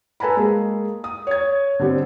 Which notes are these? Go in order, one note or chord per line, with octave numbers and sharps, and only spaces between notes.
A4 B4 G#5 A#5 B5
G#3 A#3 G#4
D#6
C#5 G#6
D3 G3 C4